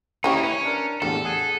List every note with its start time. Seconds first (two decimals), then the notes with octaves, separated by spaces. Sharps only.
0.24 A#3 C#4 D#4 E4 G4 C#5
0.43 C#4 B4
0.65 D4 A#4
1.02 E2 A2 D3 G3 A4
1.25 G#4 F#5 G#5